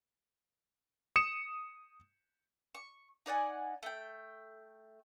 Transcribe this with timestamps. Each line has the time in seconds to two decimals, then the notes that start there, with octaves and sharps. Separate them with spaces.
1.16 D#6 C#7 E7
2.75 C#6
3.26 D#4 D5 F#5 G#5
3.83 A3 G5